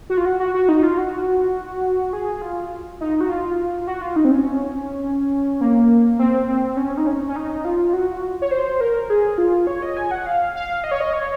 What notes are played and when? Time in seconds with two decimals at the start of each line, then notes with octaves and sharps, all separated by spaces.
0.10 F#4
0.17 F4
0.25 F#4
0.40 F#4
0.54 F#4
0.69 D#4
0.83 F4
0.98 F#4
2.13 G#4
2.42 F4
3.01 D#4
3.21 F#4
3.29 F4
3.87 F#4
4.01 F4
4.16 D#4
4.25 C4
4.31 C#4
5.61 A#3
6.19 C4
6.48 C4
6.77 C#4
6.98 D#4
7.07 C#4
7.28 C#4
7.36 D#4
7.65 F4
7.93 F#4
8.42 C#5
8.51 C5
8.81 A#4
9.10 G#4
9.38 F4
9.67 C#5
9.82 D#5
9.97 G#5
10.11 F#5
10.26 F5
10.55 F5
10.84 D#5
10.91 C#5
11.00 D#5
11.13 C#5